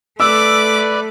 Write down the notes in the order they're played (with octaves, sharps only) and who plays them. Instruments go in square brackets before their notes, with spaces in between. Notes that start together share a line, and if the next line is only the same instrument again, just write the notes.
[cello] A3 [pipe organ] B4 D5 [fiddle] D6 [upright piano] E6